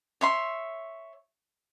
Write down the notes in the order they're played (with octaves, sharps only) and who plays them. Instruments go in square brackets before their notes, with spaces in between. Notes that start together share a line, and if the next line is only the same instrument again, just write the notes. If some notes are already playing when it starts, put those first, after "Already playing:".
[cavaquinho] C#5 E5 C6